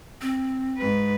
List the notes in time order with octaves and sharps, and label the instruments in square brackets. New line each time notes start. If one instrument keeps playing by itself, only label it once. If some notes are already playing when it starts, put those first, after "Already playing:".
[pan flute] C4
[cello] G#2 B4